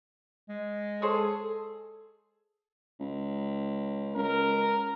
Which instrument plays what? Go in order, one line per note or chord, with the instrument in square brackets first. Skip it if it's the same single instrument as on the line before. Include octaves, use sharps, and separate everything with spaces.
[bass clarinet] G#3
[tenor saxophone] G#4 [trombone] A4 [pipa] C5 C#5
[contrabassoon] C#2
[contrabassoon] C#2 [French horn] A#4